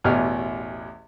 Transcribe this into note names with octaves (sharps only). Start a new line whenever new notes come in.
A1 E2 B2 G4 D#5 F6